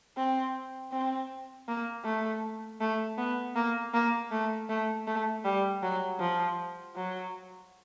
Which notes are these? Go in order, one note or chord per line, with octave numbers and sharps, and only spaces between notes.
C4
C4
A#3
A3
A3
B3
A#3
A#3
A3
A3
A3
G3
F#3
F3
F#3